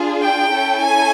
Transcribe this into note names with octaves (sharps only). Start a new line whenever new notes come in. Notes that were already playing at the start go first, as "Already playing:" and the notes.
Already playing: D4 F4 G#4
G5
C#4 E4 A4
G#5